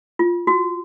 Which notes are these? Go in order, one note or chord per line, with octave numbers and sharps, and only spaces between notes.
F4
F#4